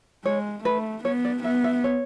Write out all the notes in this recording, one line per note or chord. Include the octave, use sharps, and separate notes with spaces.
G#3 C#5
A3 B4
B3 C#5
D5
B3 E5
E5
C#5